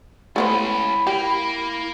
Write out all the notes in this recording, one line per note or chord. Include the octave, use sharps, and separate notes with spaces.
C#2 A3 B3 C#4 E4 C5 B5
A#3 G4